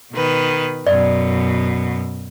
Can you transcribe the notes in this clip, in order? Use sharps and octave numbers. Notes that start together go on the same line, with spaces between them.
B2 D#3 B4
F#2 B2 D5